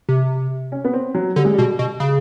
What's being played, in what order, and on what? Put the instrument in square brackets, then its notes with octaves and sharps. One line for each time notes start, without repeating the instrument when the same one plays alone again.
[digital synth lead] C3
[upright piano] C#4
B3
C4
F#3
[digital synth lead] D3 [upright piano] G3
[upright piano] G#3
G3
[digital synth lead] B2
B2
C#3